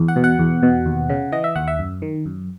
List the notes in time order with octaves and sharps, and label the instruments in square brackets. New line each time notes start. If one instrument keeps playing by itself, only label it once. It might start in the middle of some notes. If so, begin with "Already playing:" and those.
Already playing: [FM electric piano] E2
F#5
B2
F#5
E2
B2
D#2
C#3
E3 D#5
E5
D#2 F#5
E5
F#2
D#3
F#2